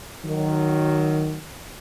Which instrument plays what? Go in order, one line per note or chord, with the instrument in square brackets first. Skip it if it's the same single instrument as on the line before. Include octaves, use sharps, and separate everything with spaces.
[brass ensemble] D#3 F#3